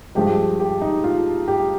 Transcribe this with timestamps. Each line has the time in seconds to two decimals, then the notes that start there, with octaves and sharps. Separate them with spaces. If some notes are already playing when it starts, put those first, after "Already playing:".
0.15 G2 F3 G#3 G4
0.60 G4
0.81 D#4
1.04 F4
1.48 G4